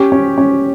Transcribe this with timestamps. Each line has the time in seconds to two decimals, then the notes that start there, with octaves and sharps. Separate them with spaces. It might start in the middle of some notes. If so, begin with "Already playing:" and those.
Already playing: C#4 G4
0.12 C#4
0.38 C#4